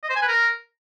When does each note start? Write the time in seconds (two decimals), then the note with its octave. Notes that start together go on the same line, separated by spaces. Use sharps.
0.03 D#5
0.09 C5
0.16 G#5
0.22 B4
0.28 A#4